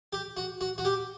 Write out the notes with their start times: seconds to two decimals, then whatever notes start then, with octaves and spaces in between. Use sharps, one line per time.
0.13 G4
0.37 F#4
0.61 F#4
0.78 F#4
0.85 G4